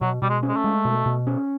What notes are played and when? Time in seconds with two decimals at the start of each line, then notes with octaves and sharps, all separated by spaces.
0.01 B2 F#3
0.22 B2 G3
0.30 G#3
0.43 C#4
0.49 G#3
0.56 A3
0.64 G#3
0.85 B2
1.06 B2
1.27 C#4